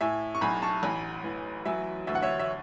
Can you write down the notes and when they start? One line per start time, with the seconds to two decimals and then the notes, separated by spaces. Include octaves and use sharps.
0.01 A2 E5 G#5
0.35 C#6
0.41 B1 G#5 B5
0.62 A5 C#6
0.83 A1 G#5 B5
1.24 E3
1.65 F#3 E5 G#5
2.07 D2 E5
2.15 F#5
2.22 C#5 E5
2.40 E5